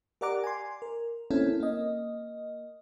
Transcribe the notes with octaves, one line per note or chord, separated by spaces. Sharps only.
G4 A#4 D5 F#5 A#5 D6
G#5 C6
A#4
A#3 C4 C#4 E4 A4
A#3 D#5